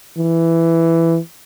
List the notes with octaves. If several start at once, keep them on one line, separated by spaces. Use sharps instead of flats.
E3